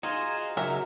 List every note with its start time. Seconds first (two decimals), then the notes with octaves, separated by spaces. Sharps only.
0.03 D#4 F4 F#4 G#4 C5 G#5 A#5
0.57 C#3 F#3 D#4 A#4 E5 E6